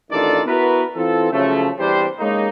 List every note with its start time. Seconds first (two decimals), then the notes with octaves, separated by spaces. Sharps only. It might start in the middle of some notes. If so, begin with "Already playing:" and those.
0.12 A1 D#3 D4 F4 A4 D5
0.47 B3 E4 F#4 A#4 B4
0.95 E3 C4 F4 A4
1.31 C#3 F3 F#3 A3
1.78 E2 G3 C4 D4 G4 C5
2.19 G#3 A#3 C#4 D#4